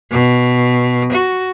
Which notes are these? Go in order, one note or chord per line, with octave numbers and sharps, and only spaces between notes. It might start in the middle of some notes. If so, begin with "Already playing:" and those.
B2
F#4